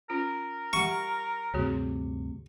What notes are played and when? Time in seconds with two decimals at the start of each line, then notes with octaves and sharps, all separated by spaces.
0.10 C#4 F4 A#4
0.73 G3 G4 F#5 C#6
1.54 D2 G2 C3 F#4 G#4 C#5